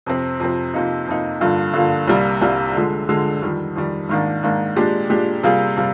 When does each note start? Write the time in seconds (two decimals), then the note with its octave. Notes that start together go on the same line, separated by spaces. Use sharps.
0.06 F2 C3 F3 C4
0.40 F2 C3 F3 C4
0.74 F2 C3 F3 A#3 D#4
1.07 F2 C3 F3 A#3 D#4
1.41 G2 D3 F3 A#3 F4
1.74 G2 D3 F3 A#3 F4
2.07 C2 C3 G3 A#3
2.41 C2 C3 G3 A#3
2.75 D3 F3 G#3
3.09 D3 F3 G#3
3.42 F2 D#3 G3
3.76 F2 D#3 G3
4.09 G#2 D#3 A#3 D4
4.43 G#2 D#3 A#3 D4
4.76 A#2 G#3 D4 G4
5.10 A#2 G#3 D4 G4
5.43 C3 G3 A#3 F4 G#4
5.77 C3 G3 A#3